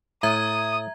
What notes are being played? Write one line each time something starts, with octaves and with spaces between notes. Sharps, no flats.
A2 E5 A#5 D#6 G#6